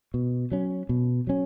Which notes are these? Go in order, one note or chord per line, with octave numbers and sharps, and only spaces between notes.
B2
F#3 C#4
B2
F#3 C#4